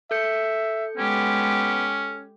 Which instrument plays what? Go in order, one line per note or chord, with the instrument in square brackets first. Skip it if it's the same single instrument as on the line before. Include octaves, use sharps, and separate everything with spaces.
[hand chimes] A4 G6 C#7 [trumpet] E5
[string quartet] G#3 G4 [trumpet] B3 [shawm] C#4